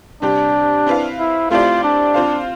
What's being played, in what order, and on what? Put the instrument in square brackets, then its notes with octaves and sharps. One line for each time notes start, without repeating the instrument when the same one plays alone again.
[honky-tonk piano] C3 G3 C4 G4 [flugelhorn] D4
[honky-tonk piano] C4 E4 B4 F5
[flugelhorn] E4
[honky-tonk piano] A3 C4 E4 G4 D5 [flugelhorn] F4
[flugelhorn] D4
[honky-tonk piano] C4 F4 C5 F5